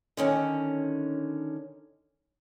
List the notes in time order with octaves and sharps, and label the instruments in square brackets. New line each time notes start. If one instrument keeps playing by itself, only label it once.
[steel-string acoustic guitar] D3 D#3 C#4